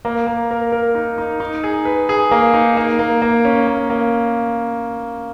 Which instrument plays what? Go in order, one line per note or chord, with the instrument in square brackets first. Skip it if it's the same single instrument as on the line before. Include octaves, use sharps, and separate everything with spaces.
[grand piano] A#3
A#3
A#4
A#4
D#4
D#4
D#4
G#4
B4
G#4
A#3
D#4
A#3
A#3
A#3
C#4
A#3
A#3